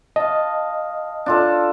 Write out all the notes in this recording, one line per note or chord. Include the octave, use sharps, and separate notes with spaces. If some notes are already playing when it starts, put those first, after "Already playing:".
D#5 F5 A5
D4 F4 A4